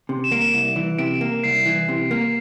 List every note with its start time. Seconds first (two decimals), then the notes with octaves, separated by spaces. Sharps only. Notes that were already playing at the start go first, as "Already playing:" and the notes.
0.09 C3
0.24 E7
0.31 A#3 D7
0.41 E7
0.53 C2 E7
0.76 E3
0.99 C3 D7
1.21 A#3
1.44 C2 C7
1.65 E3
1.88 C3
2.11 A#3